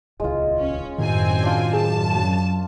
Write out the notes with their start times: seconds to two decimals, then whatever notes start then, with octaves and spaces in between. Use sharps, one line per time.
0.20 D#1 C#2 G#3 F4
0.60 C#4
0.98 F#2 A2 D#3 C4 G#5
1.43 D4 F4
1.73 F#2 G#4 A5
2.16 F#3